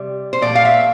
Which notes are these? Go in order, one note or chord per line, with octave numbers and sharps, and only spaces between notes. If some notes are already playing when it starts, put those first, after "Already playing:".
Already playing: C3 G3
C5
A#2 F3 A3 D5
F5
E5